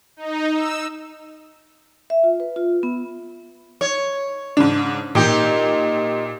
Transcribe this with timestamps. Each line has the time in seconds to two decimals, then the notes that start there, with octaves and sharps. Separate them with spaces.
0.17 D#4
0.54 E6
2.10 E5
2.24 F4
2.40 B4
2.56 F4
2.83 B3
3.81 C#5
4.57 G#2 C#3 D4
5.15 A#2 D#4 G4